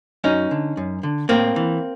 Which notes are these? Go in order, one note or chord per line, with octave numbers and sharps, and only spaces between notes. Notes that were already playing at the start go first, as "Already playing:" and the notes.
F#2 C#4 D#4
D3
F#2
D3
A2 A#3 C4
E3